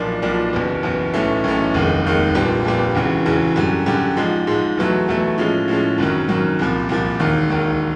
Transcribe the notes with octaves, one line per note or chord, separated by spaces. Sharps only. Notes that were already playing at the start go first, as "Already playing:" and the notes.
Already playing: B1 A#2 F3 A#3 D4
B1 A#2 F3 A#3 D4
F#1 E2 B2
F#1 E2 B2
B1 A2 E3 A3 C#4
B1 A2 E3 A3 C#4
F1 D#2 D#3 G#3
F1 D#2 D#3 G#3
A#1 A#2 G3 B3
A#1 A#2 G3 B3
E1 E2 C#3 E3
E1 E2 C#3 E3
F#2 D3 G3
F#2 D3 G3
G#2 F3 G#3
G#2 F3 G#3
E2 B2 F#3 A3
E2 B2 F#3 A3
A2 F3 G#3 C#4
A2 F3 G#3 C#4
G#1 F#2 D#3 F#3
G#1 F#2 D#3 F#3
C2 A#2 F3
C2 A#2 F3
E1 D#2 D#3
E1 D#2 D#3